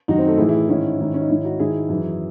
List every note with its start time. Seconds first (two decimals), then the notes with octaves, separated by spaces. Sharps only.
0.08 F#2 D#3 D#4 F#4
0.18 C4
0.28 A3
0.38 A2 E4 G#4
0.42 E3
0.48 E4 G#4
0.69 G#2 D#3 C#4 E4
0.99 G#2 D#3
1.14 C#4
1.21 D#4
1.28 G#2 D#3 C#4 E4
1.44 D#4 F#4
1.59 G#2 D#3 E4 G#4
1.89 F#2 E3